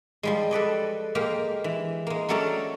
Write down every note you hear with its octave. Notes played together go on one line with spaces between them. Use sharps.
F3 G3 G#3
A4 B4 D5 D#5
G#3 A#3 G4 A#4
E3
G#3 A#3
F#3 A3 C#4 A4 D5 A#5